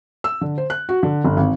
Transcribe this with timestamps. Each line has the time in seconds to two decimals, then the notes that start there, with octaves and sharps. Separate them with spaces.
0.24 E6
0.41 D3
0.58 C5
0.70 F#6
0.89 F#4
1.03 D3
1.24 G1
1.37 G#1